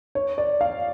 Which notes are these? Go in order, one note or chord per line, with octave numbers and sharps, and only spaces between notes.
C#5
D5
F5